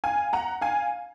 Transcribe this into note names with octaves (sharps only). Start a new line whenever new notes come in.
F5 G#5
F#5 A#5
F5 G#5